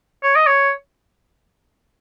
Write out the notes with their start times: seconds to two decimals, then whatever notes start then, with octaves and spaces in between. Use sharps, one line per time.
0.23 C#5
0.36 D#5
0.47 C#5